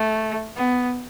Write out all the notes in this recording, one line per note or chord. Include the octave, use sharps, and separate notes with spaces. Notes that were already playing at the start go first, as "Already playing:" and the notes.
Already playing: A3
B3